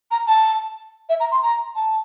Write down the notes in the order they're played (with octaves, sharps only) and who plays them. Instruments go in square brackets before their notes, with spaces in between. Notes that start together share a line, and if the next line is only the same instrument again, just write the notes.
[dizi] A#5
A5
E5
A#5
C6
A#5
A5